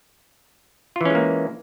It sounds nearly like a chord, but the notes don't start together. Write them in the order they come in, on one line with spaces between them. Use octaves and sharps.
F4 E3 C#4 G#3 A#3